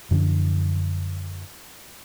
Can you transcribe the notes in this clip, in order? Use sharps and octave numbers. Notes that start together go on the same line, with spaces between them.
F#2 D3 F3 D4